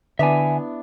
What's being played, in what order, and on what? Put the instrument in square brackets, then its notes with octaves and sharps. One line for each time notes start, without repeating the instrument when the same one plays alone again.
[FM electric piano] D3 [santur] B3 D4 E4 [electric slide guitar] E5 G#5